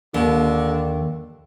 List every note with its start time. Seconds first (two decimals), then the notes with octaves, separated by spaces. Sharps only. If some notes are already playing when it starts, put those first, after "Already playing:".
0.14 D#2 D3